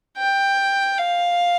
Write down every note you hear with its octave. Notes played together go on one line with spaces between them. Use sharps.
G5
F5